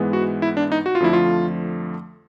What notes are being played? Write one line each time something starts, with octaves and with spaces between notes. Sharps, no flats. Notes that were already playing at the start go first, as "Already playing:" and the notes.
Already playing: G#2 E3 G#3 B3
F#4
E4
D4
D#4
F#4
F4
F2 D3 F3 A3 E4
F4